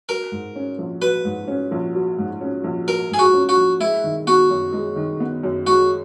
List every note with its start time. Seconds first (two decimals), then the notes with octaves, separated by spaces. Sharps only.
0.09 F#3 A#4
0.32 G#2
0.56 C#4
0.78 A#1
1.01 F#3 B4
1.25 G#2
1.48 C#4
1.71 A#1
1.95 F#3
2.18 G#2
2.41 C#4
2.64 A#1
2.88 F#3 A#4
3.11 G#2 G#4
3.19 F#4
3.34 C#4
3.49 F#4
3.57 A#1
3.80 G#3 E4
4.04 D#3
4.27 B3 F#4
4.50 F#2
4.73 G#3
4.96 D#3
5.20 B3
5.43 F#2
5.66 G#3 F#4